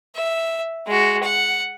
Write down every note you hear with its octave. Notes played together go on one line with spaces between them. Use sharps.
E5
G#3 F#4
F#5